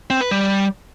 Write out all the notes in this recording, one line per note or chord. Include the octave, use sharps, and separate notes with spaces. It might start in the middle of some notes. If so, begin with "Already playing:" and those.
C4
B4
G3